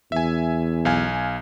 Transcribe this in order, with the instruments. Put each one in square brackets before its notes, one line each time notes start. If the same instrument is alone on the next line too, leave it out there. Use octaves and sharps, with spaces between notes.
[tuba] E2 [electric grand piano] E5 G#5
[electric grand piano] B1 F5 G#5